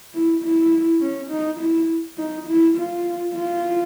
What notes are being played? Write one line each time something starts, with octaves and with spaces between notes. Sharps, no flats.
E4
E4
C#4
D#4
E4
D#4
E4
F4
F4